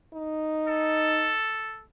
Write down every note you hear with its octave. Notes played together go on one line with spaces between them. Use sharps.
D#4
A4